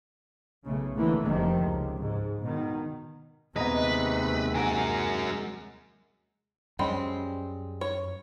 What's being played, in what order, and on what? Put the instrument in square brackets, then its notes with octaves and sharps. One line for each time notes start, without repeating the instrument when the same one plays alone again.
[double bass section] B1 C#3 A3
D3 E3 F3 A3 A#3
F1 C3 D#3 F3
C#2
G#2
B2 D#3
[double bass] D#2 C3 [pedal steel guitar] G#3 D#4 A#5 [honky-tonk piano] B3 D#5 [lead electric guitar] B4
[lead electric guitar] F#3 A#4 [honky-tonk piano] F#5 G#5
[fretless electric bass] F#2 C#4 [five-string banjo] G3 G#3 C4
[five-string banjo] C#5